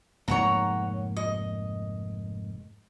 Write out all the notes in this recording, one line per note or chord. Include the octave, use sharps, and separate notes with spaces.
F1 G#2 A#3 C#5 F#5 A#5
D#5